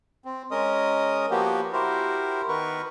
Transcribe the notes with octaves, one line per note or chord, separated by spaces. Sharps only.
C4
G#3 C#4 A#4 D#5 D#6
F3 A#3 B3 F#4 G4
E4 F#4 G4 A#4 C5
D#3 B3 A#4 B4 C#6